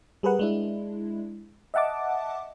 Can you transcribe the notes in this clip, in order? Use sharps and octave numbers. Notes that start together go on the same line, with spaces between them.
G3 G#4 A#4 B4 F#5
G#3 D4 E4
D#5 E5 F#5 A5 D6